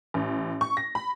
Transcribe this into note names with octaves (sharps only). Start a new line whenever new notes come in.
A1
C#6
A#6
B5